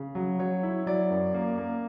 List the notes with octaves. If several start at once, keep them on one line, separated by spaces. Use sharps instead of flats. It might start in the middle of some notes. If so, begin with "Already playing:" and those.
Already playing: C#3
F#3
F#3 C#5
E4
F#3 D5
F#2
A#3
A#3